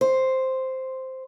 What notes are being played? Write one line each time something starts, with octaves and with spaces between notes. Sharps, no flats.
C5